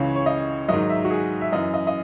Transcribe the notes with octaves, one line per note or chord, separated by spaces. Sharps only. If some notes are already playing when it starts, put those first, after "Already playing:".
Already playing: C#2 C#3 E3 C#5
C#5
D#5
G#2 D#3 F#3 D#5
E5
F#4
G#4
E5
F#2 E3 D#5
D#5
D#5